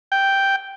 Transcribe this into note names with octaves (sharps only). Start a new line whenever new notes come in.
G5